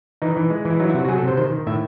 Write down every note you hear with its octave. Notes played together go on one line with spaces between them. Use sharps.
E3 D#4
E3
G#3
E3
E4
F#3 D#4
E4
C3 F#4
F#4
F#3 G#4
A4
C3 C5
D#3 C5
D#3
A2 E5